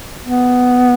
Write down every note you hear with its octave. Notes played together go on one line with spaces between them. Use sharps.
B3